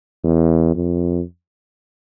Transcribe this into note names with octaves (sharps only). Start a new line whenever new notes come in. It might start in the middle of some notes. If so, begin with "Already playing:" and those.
E2
F2